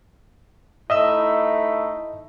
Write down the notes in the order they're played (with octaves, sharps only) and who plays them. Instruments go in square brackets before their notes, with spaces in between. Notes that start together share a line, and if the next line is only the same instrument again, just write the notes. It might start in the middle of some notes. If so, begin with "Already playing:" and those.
[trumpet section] A3 D#4 E4 [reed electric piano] D#5 E5 E6